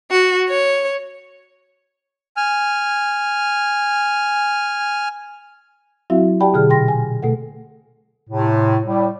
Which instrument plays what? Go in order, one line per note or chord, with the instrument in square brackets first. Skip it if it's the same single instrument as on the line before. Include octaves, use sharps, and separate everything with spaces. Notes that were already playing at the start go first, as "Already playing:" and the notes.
[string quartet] F#4
C#5
[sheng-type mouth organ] G#5 F6
[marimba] F#3 C4 E4 F#4 E5 F5
G4 D5 F#5 G5 A5 B5
B2 D3 G#4 F6
A#2 G5 C6 A#6
G#5
B2 A3 A4 F#5
[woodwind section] A2 C3
A2 G3